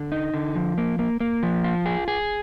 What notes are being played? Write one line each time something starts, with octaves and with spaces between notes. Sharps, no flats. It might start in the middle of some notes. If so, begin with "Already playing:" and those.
Already playing: D3
D#4
D3
F3
A#3
A#3
A#3
F3
F4
G#4
G#4